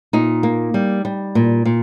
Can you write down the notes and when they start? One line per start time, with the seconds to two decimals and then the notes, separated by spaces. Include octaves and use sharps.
0.13 A#2 D#4
0.43 A#3
0.74 G3
1.05 G3
1.35 A#2
1.65 A#2